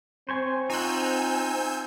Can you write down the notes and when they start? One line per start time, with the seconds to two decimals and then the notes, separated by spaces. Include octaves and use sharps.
0.29 C4 C5 C#5 G#5
0.70 D#4 F4 F#5 G#5 E6 G6